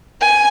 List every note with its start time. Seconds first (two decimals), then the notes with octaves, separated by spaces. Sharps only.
0.21 G#5